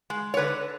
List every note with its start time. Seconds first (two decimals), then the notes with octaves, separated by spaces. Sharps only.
0.10 G#3
0.34 C#5
0.37 D3 B4